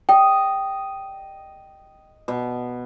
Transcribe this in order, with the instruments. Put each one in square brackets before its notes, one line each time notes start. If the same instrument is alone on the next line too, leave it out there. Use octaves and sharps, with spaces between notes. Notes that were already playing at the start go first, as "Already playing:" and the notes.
[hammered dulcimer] D#5 [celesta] G5
[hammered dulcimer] B2